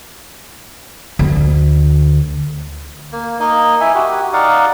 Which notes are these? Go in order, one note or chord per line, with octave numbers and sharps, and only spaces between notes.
D2
A#3
A#3 D#4 D#5
E4 E5 G#5
F#4 G4
D#4 D5 F5 F#5